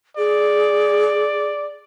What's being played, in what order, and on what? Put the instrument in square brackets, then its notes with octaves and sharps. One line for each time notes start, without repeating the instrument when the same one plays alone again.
[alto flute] G#4 [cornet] D5